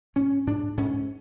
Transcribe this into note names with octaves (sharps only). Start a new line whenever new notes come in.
G#2 C#4
G#2 D4
G#2 C#4